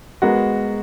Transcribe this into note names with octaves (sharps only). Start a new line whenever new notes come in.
G#3 B3 F#4 A#4